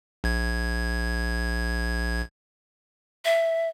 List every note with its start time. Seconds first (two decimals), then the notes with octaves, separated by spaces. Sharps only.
0.24 A#1 G#6
3.25 E5